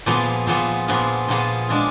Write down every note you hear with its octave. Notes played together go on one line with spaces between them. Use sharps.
A#2 F3 B3 F4 G#4
A#2 F3 B3 F4 G#4
A#2 F3 B3 F4 G#4
A#2 F3 B3 F4 G#4
G#3 D4 F4 G#4